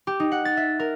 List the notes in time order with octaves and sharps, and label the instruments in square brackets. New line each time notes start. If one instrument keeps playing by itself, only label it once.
[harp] G4
D#4
F#5
A6
E5
A#4